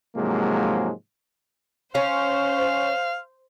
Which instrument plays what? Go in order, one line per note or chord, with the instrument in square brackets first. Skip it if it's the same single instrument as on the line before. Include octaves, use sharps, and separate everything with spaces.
[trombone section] G#2 C3 F3 F#3 G#3 A#3
[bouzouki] C#4 [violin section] C5 [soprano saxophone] F5